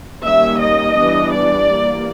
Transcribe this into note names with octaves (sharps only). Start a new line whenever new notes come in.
D#3 G3 A#3 C#4 E5
D#5
E3 G3 B3 D4
D5
E3 G3 A#3